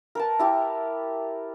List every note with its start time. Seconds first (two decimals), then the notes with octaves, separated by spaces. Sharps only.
0.15 A#4 B4 A5
0.39 E4 G4 D6